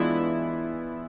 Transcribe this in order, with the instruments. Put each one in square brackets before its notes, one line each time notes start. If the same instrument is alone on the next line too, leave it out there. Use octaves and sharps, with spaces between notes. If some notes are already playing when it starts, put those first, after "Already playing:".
Already playing: [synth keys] E3 E4 [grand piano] G#3 B3 D4 F4